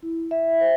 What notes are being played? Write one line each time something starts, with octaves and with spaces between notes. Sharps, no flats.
E4
E5
C5